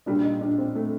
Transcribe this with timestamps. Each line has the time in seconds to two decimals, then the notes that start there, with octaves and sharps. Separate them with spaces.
0.06 A#1 A#2 G3 D4
0.24 D#4
0.41 D4
0.58 C4
0.75 A3